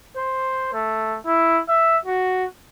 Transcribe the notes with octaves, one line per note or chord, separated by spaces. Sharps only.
C5
A3
E4
E5
F#4